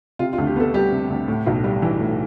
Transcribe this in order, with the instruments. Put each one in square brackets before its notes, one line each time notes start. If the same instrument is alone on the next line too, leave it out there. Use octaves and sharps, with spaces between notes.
[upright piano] C3 F4
F4
D2
G4
B3 A4
G3 G4
C3
D2
A2
B1
G3
E3
A2